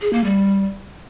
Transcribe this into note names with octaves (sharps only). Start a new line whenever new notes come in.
G#4
A#3
G3